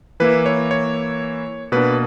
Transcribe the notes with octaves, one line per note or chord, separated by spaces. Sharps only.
E3 A#3 E4 B4
C#5
C#5
B2 A#3 D4 B4